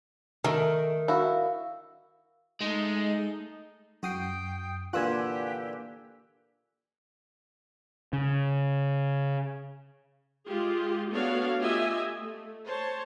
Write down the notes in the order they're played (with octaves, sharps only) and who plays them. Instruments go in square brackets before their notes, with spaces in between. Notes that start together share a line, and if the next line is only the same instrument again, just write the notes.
[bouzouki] D#3 [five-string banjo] A3 A#4
[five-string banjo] E4 F#4 [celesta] F5
[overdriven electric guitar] G#3 [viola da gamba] A3 A4 [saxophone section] D#4
[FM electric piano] F#2 D#6 C7 [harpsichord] F#4 [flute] G5
[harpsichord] A#2 D3 E3 [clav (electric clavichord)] F4 [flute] G4 [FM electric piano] G#5 E6 F#6
[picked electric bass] C#3
[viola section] G#3 F4 G4 G#4
A3 B3 D4 F#4 C#5 F5
A3 F4 G4 D#5 E5 G#5
A3
C5 C#5 A5